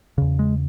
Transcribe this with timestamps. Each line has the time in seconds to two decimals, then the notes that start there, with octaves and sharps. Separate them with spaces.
0.18 E2 C#3
0.39 G#3